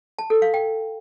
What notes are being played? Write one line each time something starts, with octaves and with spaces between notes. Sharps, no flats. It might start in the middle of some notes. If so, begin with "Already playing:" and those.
A5
A4
F5
G5